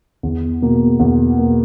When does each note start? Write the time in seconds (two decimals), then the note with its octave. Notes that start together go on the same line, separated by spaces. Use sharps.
0.23 E2
0.62 B2 A#3
1.00 E2
1.39 B2 A#3